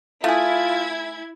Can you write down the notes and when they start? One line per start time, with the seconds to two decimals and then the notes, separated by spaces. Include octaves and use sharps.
0.24 A3 E4 F4 G#4 G#6